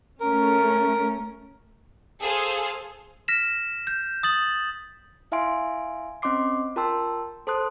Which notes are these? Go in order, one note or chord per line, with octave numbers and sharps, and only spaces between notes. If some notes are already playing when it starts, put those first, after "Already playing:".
A3 C#4 A#4
G#4 A4 C5 F5
F6 A#6 B6 E7
G6
D#6 A6 F#7
E4 E5 F5 G#5 C6 D7
C4 C#4 D#5 C6 D6 C7
F4 A#4 G5 A5 C6 E6
A4 C5 A5 C6 D#6 F#6